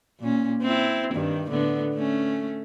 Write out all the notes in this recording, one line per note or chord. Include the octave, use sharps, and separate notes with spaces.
A#2 C#4
C4 E4
G2 D#3
A2 D3 B3
A3 C#4